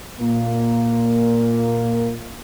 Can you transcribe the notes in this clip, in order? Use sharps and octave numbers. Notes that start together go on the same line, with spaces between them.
A#2 A#3